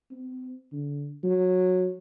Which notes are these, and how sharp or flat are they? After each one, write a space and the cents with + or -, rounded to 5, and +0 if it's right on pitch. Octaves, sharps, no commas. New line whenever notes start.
C4 -40
D3 -30
F#3 -15